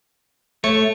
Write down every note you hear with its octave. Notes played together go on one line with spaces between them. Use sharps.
A3 C#5